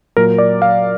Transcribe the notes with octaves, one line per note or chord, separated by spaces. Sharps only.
A#2 F#3 A#4
D5
F5